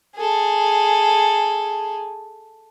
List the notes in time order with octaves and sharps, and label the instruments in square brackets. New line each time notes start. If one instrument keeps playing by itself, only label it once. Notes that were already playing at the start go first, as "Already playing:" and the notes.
[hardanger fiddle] G#4 A4